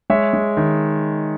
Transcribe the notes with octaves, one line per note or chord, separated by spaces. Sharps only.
G#3 C#5 E5
G#3
D#3